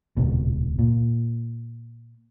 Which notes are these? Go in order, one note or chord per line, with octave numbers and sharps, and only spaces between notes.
D#1 C#2 B2
A#2